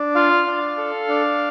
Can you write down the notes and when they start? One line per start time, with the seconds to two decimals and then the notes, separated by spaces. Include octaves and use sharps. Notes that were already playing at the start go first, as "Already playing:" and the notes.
Already playing: D4
0.15 F4 F5
0.47 D4
0.77 A4
1.08 D4